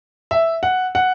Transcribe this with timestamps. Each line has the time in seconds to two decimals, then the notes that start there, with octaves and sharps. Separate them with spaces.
0.31 E5
0.63 F#5
0.95 F#5